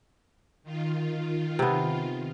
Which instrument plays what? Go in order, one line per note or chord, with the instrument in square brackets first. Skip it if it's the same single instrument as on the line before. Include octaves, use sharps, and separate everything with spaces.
[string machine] D#3 F4
[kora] C3 B3